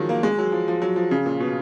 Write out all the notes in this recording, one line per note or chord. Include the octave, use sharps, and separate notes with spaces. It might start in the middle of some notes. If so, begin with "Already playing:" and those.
Already playing: D#3 F3 F#3 G#3
A#3
G#3
F#3
F3
F3
F#3
F3
C#3
A#2
B2